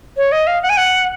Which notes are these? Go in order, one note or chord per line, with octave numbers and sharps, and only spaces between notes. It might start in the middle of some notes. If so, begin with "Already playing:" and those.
C#5
D#5
F5
F#5
G#5
F#5